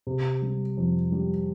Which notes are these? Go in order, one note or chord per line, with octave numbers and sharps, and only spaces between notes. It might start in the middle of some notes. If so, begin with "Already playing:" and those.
C3
G3
F2
G3